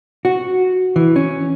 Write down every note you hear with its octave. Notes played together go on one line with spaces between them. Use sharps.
F#4
E3
C#4